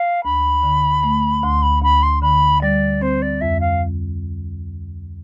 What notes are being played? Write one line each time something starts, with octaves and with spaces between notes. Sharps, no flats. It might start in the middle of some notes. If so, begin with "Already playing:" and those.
Already playing: F5
D2 B5
D3
A3
D2 C6
B5
D2 B5
C6
D3 B5
G3 D5
C4 C5
D5
F2 E5
F5